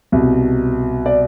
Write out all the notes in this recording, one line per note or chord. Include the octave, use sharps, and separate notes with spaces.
C2 B2
D5